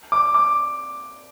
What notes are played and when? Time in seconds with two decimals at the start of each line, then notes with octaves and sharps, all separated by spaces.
0.12 D6
0.34 D6